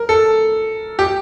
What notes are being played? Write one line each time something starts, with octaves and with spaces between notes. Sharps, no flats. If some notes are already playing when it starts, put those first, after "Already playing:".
Already playing: A#4
A4
G4